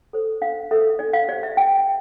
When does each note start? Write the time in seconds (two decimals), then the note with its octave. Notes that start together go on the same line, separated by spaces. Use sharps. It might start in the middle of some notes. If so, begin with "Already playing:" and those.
0.13 A4 C5
0.41 D4 F5
0.71 A4 C5 E5
0.99 D4 D5
1.13 F5
1.28 G4 C5 D5
1.43 E5
1.57 D4 G5